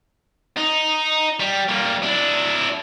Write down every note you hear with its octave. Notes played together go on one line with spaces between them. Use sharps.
D#4
G3
G3 A#3
D4 E4